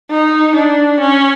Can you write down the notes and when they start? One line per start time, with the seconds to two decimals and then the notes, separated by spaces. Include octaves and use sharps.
0.11 D#4
0.55 D4
1.00 C#4